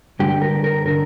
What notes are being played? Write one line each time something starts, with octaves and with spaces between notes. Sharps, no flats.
G2 D3 G4
A#4
A#4
D3 A#4